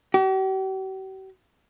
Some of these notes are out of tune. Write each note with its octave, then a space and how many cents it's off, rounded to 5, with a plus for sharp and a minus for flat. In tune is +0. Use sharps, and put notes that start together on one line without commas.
G4 -45